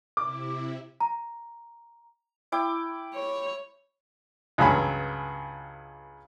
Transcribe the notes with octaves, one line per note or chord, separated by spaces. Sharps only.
C3 E4 D6
A#5
E4 G5 D6
C#5
C#2 G2 F#3 G#5 B5